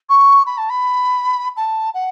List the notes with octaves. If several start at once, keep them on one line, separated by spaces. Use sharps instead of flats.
C#6
B5
A5
B5
A5
F#5